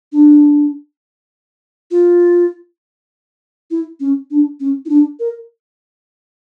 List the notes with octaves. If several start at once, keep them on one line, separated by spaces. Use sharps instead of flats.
D4
F4
E4
C#4
D4
C#4
E4
D4
A#4